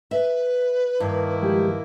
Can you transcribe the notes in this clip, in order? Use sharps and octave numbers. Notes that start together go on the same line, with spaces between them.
B4 E5
G2 D#3 A#3 E4
F3 G#3 G4